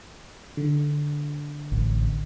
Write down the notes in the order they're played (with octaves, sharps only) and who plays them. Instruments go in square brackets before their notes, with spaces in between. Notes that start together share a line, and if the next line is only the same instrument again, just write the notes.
[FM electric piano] D3
[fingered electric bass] A1